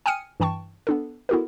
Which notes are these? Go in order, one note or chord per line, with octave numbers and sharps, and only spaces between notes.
G5 G#5 D#6 F6 C#7 D#7
G2 E3 G5 A5 C#6
B3 D4 A4
B3 E4 F#4 A4 A#4